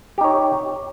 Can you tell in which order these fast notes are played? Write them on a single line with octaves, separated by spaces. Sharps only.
G4 D#4 C#5